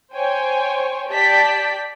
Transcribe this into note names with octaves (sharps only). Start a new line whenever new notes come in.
C5 C#5 G5 G#5
G4 D5 A5 G6 B6